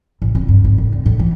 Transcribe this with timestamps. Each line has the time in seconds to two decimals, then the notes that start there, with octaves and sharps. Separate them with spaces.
0.22 A1
0.35 C4
0.48 G2
0.64 G#1
0.78 A2
0.93 D3
1.06 A2
1.19 E3